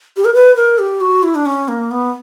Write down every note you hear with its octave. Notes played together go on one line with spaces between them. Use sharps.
G4
A#4
B4
A#4
G4
F#4
E4
D4
C#4
A#3
B3